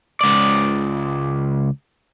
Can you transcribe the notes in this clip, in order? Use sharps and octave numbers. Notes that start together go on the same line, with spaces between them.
C#2 D5